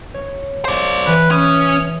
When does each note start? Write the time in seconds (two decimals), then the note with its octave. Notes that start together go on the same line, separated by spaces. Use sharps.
0.14 C#5
0.65 C5 D5
1.07 E3 B4
1.31 C#4 D#6